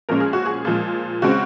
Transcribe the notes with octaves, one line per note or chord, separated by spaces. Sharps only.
A#2 F3 G#3 C#4 A#4
G#4
F#4
G#4
A#2 F3 G#3
C#3 G#3 C4 F#4